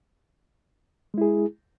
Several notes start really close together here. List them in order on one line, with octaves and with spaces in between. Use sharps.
G#3 E4 G#4